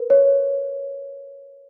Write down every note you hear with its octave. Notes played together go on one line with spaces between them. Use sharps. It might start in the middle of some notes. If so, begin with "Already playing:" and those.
Already playing: A#4 B4
C#5